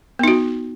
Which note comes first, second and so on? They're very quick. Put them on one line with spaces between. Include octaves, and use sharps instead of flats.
B3 D#4 F#4